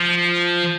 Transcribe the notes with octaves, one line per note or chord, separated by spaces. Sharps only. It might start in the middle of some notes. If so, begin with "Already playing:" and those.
Already playing: F3